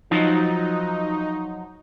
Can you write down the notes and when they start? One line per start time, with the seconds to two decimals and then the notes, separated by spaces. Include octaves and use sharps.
0.11 F3 F#3 D#4